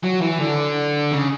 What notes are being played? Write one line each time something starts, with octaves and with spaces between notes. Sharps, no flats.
F#3
E3
D3
C#3